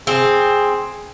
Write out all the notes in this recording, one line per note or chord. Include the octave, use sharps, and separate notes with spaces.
C4 G#4